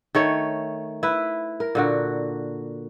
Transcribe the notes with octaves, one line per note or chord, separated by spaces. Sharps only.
D#3 A3 C#5
E4 B4
A#4
A#2 D3 F#4